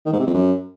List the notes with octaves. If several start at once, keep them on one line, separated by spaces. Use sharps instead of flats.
D#3
G#2
C3
F2
F#2